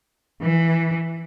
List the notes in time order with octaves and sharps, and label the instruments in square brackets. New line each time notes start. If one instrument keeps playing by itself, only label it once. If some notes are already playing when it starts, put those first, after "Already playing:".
[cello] E3